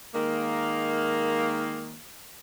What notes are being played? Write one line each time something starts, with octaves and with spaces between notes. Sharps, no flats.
D#3 G#3 A#3